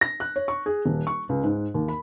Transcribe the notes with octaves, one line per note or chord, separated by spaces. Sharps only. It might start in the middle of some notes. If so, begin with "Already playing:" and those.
A#6
F#6
C#5
C#6
G#4
D#1
C#6
C#2
G#2
D#2
B5